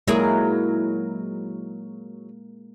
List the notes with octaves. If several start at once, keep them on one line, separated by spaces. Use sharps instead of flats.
F#3 G#3 A#3 E4 G#4 A#4